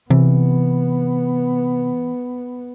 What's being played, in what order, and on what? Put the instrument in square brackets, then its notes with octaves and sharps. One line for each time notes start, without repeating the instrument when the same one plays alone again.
[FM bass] C3 [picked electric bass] E3 [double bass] B3